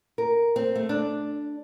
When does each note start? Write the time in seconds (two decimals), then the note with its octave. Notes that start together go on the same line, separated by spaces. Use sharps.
0.18 A#4
0.56 C4
0.75 A3
0.89 D4